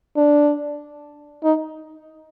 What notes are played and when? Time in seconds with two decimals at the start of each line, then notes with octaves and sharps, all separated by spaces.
0.17 D4
1.44 D#4